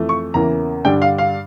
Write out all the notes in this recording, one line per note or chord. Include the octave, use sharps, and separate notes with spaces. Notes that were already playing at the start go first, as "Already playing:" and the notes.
Already playing: F2 E3 A3
C#6
E2 C#3 E3 A#3 A#5
G2 D3 G3 D4 G5
F5
F5